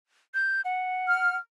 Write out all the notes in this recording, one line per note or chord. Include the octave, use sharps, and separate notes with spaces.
G6
F#5
F6